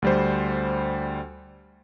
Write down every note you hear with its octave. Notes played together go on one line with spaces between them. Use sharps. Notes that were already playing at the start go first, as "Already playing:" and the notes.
D2 G3 C5